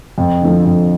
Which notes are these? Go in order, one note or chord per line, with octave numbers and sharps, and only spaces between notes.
F2
D3 F3
F2